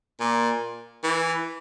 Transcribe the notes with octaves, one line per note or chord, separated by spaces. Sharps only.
A#2
E3